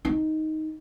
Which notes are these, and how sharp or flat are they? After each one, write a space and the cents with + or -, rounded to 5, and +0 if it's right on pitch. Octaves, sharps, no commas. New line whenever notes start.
D#4 +5